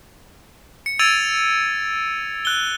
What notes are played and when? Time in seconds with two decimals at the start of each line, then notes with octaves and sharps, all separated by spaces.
0.86 C#7
0.99 E6 G#6 A6 D7 D#7 F7
2.45 F#6 G7